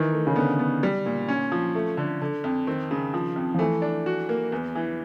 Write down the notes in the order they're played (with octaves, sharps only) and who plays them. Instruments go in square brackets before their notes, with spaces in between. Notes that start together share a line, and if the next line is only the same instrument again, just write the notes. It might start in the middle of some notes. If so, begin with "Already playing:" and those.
Already playing: [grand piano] D#3 [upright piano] E3
[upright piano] A3
[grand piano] C#3
[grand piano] D3 [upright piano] B3
[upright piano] B3
G3
A#2
C#4
F3
A3
D3
D3
F2
[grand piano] D#3 [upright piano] C4
[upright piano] C#3
F3
F2
[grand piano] F3
[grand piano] E3 [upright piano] A3
[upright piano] D4
F#4
A#3
E2
E3